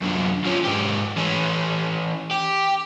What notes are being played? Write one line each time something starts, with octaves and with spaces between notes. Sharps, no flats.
F#2 D3
F3 C#4
G#2 G4
E3 C#4
G4